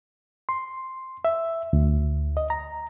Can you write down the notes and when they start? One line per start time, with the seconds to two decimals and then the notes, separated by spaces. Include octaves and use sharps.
0.49 C6
1.25 E5
1.73 D2
2.37 D#5
2.50 A#5